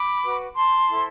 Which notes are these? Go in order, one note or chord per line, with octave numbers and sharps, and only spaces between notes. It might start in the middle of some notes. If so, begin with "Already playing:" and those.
Already playing: B5 D6
F#4 B4
A5 C6
E4 A4 C5